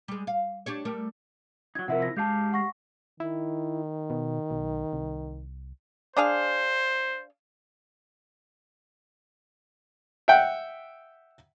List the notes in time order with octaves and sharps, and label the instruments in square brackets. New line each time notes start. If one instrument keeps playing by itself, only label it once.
[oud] G3 G#3
F5
D4 G4 C#5
G3 A3 A#4
[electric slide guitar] F#3 D#4 [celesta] G#6
[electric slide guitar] C3 F3 E4 [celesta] A#4 E5 F#5
[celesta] A#6
[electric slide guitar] G#3 G4 F5 [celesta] A5 G6
[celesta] F#5 C#6 A#6
[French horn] D#3 [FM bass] E4
[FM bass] B2
B1
C2
[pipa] D4 G#4 F5 [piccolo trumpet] C5
[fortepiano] E5 F#5 G5